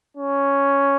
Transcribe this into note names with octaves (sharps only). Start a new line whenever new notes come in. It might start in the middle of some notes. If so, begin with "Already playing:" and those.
C#4